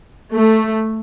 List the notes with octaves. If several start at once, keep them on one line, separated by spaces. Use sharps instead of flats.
A3